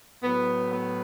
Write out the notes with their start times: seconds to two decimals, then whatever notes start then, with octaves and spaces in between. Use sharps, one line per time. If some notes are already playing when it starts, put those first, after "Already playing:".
0.22 A2 F#3 B3
0.71 B3